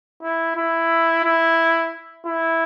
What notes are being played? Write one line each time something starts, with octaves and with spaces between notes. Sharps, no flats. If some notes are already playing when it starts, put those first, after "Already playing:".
E4
E4
E4
E4